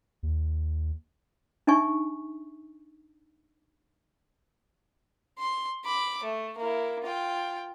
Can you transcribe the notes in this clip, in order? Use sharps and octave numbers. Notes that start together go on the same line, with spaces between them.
D#2
D4 D#4 E5 G#5 C#6
C6
B5 D6
A3
A#3 E4
F4 G5